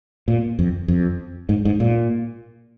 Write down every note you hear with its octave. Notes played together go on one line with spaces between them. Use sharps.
A#2
F2
F2
G#2
G#2
A#2